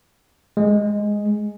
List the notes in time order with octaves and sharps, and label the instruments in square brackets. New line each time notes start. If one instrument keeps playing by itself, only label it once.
[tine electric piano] G#3